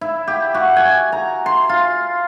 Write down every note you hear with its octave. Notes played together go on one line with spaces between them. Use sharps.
E4
G4
F#4
G#5
A#5
C6
F4